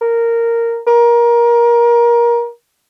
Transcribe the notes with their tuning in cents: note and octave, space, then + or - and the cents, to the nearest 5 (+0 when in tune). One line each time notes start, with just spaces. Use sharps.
A#4 -10
A#4 +25